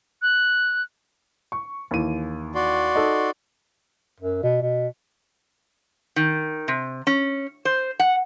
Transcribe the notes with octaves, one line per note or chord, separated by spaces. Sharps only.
F#6
C#6
D#2 E3 D#7
F#4 D5 C6
D#4 A4
F#2
B2
B2
D#3
C3
C#4
C5
F#5